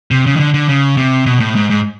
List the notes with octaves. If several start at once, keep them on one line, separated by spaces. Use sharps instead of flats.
C3
C#3
D#3
D3
D3
C#3
C3
B2
A2
G#2
G#2